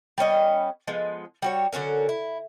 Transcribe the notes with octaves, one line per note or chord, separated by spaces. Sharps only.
G3 B3 C#4 D#5
F3 G#3 B3
G3 F#4 C#5
D3 F#3 C#4 A#4
E4